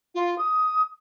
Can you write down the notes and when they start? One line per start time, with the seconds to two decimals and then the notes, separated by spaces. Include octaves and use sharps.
0.15 F4
0.38 D#6